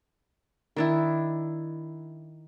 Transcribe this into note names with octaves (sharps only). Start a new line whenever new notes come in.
D#3 D4 E4